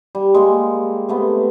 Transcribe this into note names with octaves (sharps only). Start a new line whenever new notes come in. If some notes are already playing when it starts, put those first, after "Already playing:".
G3
G#3 A#3 G5
C3 A3 B3